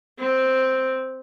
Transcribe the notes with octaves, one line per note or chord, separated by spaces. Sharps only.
C4